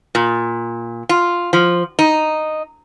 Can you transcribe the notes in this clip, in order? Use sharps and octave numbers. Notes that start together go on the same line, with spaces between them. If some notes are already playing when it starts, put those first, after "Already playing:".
A#2
F4
F3
D#4